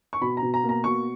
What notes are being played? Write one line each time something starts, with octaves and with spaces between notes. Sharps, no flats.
C#6
B2 B5
A#5
B2
A#5
A#3
A#5
B2 C#6